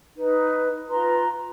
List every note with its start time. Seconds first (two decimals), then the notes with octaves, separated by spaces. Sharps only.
0.17 D#4 B4
0.88 F4 B4 A#5 C6